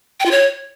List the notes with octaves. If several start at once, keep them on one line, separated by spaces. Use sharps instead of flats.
G5
F4
C#5